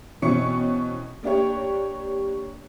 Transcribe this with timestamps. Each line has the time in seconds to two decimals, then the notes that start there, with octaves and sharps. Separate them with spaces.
0.22 B2 E3 C4 C#4 C#6 C#7
1.23 A#3 D4 G4 C#5